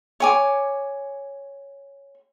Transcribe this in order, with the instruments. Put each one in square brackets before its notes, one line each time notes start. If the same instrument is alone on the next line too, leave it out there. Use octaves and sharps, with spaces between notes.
[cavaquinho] C#5 G#5 D6